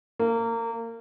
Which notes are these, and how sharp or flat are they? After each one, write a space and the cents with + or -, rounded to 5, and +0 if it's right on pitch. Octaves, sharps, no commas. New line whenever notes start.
A#3 -25